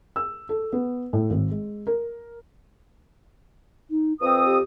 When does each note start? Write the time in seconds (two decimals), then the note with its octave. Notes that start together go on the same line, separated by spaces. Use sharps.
0.16 E6
0.49 A4
0.73 B3
1.13 A2
1.30 G#1
1.51 G#3
1.87 A#4
3.90 D#4
4.21 F2 C4 B4 D#6
4.45 G4